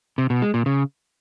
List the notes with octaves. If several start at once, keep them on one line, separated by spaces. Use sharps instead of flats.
C3
B2
G#3
A#2
C#3